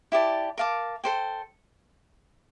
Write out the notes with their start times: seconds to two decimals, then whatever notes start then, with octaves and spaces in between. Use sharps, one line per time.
0.12 E4 G4 D5 A5
0.58 A#4 F5 A5 D6
1.04 A4 C5 G5